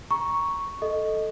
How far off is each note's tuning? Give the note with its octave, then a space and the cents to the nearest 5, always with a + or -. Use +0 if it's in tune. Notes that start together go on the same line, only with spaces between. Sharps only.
A#5 +15 C#6 +0
A4 +0 D#5 +0